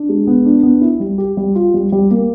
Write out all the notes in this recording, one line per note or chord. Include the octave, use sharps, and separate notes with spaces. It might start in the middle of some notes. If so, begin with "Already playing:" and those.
Already playing: D4
G#3
B3
D4
B3
E4
G3
G4
G3
F4
G3
G3
A#3